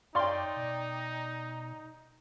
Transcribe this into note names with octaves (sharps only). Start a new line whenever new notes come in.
F#2 D#4 C#5 D5 F5 G5 C6
B2